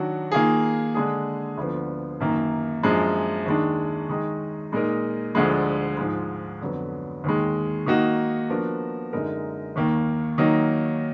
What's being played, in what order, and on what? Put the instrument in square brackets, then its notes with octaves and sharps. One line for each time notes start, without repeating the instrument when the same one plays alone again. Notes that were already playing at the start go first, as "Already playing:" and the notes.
Already playing: [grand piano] D#3 F#3 D4 F#4
D#3 A#3 F4 G#4
D3 G#3 D4 G#4
D2 D3 F3 B3
F#2 D#3 A#3
F#2 F3 G#3 D4
D#2 D#3 G#3 D4
D#3 G#3 D#4 G#4
A#2 G#3 D#4 A#4
D2 D3 F3 G#3
G#2 F3 G#3
F2 D3 F#3 B3
D#2 D#3 G#3
D#3 A#3 D#4 F#4
F3 B3 D4 F#4 A#4
F#2 D3 G#3 D#4 A#4
D#2 D#3 A#3
D#3 F#3 A#3 D#4